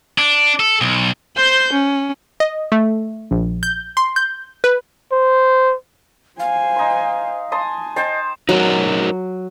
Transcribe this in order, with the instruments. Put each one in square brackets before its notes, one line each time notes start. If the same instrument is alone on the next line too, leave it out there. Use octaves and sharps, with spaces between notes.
[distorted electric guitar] D4
A4
B1
[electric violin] C5 G6
C#4
[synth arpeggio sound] D#5
A3
A#1
G6
C6
G6
B4
[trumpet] C5
[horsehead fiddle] C5 G#5 [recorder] F5
[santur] D#4 C6
[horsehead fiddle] G#5 [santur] A5 C6 D#6
[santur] C5 G5 A5 [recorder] D#5
[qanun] F#3 [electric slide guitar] D#4 F#4 A#4